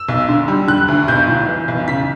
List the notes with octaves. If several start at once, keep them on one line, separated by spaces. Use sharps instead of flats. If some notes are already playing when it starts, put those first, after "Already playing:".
Already playing: E6
B1
D3
G3
D3 F#6
D2
B1 G6
A2
E3
B1
C#3 B6